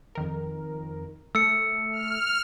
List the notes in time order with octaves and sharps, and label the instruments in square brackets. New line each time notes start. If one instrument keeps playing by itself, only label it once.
[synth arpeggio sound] F2 D#3 A#4
[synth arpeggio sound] A3 [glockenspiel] E6 C#7
[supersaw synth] F6